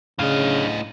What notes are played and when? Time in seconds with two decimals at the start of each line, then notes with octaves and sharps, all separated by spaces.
0.19 A2 C#3 D4 D#5 F5